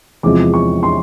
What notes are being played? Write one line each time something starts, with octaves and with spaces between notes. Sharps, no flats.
E2 C3 F3 G#3 D6
C#6
C6